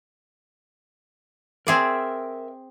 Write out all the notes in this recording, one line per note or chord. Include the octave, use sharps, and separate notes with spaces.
C4 G#4 A#4 D5 E5